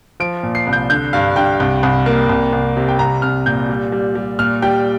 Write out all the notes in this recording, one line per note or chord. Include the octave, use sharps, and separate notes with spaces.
F3 D7
A#2
C7
C2
G6
D3 G6
G2 F5
G2 G5
C2
C2
A#3
C2
C2
C3
G5
C2 A#5
C2 F6
A#2 G6
G3
G3
G3
A#2 F6
G3 G5